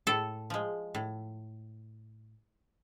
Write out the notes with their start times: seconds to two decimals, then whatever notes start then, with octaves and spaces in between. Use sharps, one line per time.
0.07 A2 A4
0.50 F3 G#3
0.95 A2